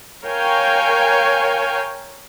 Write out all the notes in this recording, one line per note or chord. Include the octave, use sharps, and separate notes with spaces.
A#4 C#5 F5 G5 G#5